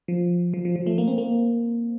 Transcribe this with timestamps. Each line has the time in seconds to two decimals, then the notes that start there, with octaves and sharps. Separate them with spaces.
0.08 F3
0.54 F3
0.65 F3
0.76 F3
0.86 A3
0.98 A#3
1.08 C4
1.18 A#3